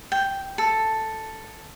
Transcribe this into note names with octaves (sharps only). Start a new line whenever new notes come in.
G5
A4